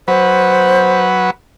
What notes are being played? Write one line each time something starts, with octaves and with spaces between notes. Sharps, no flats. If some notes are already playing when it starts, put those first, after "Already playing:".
F#3 B4 C5